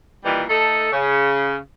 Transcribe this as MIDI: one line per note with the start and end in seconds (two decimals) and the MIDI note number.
0.25 0.44 46
0.25 0.44 51
0.25 0.44 52
0.25 0.44 55
0.49 0.92 57
0.49 0.92 63
0.49 0.92 69
0.92 1.56 49